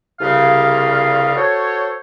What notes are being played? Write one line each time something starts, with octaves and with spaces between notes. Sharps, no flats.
C2 G2 C#3 F4 F5
F#4 A4 C5 C#5